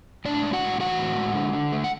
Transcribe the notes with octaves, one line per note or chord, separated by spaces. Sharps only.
A2 D4 D5
G#3
F#4 F#5
A2
E3 F#4 F#5
A2
G#3
D3
D3
A3
F#5